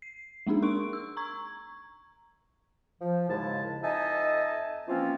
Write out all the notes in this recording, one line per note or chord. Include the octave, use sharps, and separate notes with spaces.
C7
G#3 A#3 D4 D#4 G#4
A#4 C6 C#6 D7
E6
A#5 C#6 G#6
F3
D#2 G#2 C#3 G#3 E4 A5
F2 D#4 D#5 E5 G#5 A5
E3 F3 A#3 C4 C#4 F4